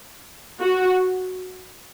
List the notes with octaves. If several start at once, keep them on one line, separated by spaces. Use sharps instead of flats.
F#4